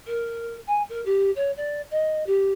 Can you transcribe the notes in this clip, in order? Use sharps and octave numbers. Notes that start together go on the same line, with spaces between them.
A#4
G#5
A#4
G4
C#5
D5
D#5
G4